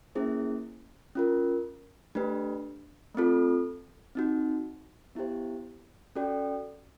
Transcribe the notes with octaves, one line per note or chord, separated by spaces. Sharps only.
A#3 C#4 E4 G#4 C5
C#4 F4 A#4
A3 D4 G4 B4
A3 C4 F4 A4
C4 D#4 F#4
B3 E4 G4 C5
C#4 F#4 A4 D5 G5